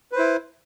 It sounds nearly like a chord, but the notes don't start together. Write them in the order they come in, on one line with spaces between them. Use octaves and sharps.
B4 C5 E4